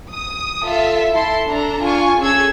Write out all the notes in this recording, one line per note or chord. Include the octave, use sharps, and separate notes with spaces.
D#6
F4 A4 E5
E4 A4 A5 C6
D4 A4 A#5
D4 F4 G#5 C#6
C#4 G#4 A4 E6 G#6